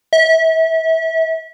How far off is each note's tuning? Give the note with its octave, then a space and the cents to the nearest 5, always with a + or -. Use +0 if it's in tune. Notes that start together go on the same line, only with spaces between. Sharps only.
E5 -30